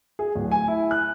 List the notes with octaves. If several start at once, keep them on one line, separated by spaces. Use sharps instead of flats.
G#4
D1
G#5
E4
F#6